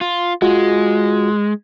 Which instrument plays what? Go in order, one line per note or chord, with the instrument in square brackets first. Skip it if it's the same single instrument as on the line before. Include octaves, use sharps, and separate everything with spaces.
[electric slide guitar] F4
[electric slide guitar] G#3 [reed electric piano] F4 F#4